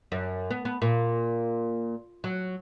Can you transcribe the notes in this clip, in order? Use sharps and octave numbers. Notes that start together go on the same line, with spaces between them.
F#2
B3
B3
A#2
F#3